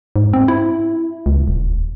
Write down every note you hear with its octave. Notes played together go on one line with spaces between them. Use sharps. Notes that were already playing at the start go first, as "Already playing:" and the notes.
G#2
C4
E4
C#2
D#1